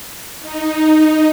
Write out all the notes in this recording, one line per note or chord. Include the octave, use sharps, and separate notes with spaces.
D#4